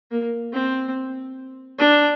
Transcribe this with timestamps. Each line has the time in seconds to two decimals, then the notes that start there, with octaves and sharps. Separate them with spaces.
0.11 A#3
0.53 C4
1.79 D4